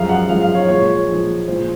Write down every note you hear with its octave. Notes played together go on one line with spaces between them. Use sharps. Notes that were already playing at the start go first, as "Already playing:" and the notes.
Already playing: F#2 F3 G#3 F5
F#5
F#2 F3 G#3 F5
F5
C#5
A#2 F3 G#3 C#5
A#2 F3 G#3
A#2 F3 G#3 C5